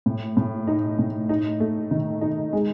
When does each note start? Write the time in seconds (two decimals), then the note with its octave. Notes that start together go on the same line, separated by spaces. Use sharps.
0.06 A2
0.37 A2
0.67 D#4
0.99 A2
1.29 D#4
1.60 A3
1.91 D#3
2.21 D#4
2.53 G#3